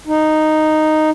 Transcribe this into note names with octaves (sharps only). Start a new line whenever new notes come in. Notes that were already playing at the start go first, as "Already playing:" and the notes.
D#4